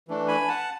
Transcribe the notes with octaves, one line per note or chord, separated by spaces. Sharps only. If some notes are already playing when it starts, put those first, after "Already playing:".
E3 A3 D4
G#5 B5
F#5 A5